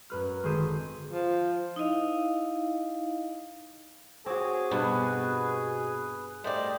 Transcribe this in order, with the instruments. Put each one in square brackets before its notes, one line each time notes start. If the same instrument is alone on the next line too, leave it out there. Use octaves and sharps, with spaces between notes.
[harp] F#2 B4 F6
G#1 D3 G#4 C5 B6 D#7
[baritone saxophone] F3
[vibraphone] D#4 E4 D#5 F5
[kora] C4 F#4 [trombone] G#4 [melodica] C#5 D6
[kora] G2 [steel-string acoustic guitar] B2 [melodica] F#4 B4
[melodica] B4
[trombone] G3 [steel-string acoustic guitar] A3 D5 [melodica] C5 D#5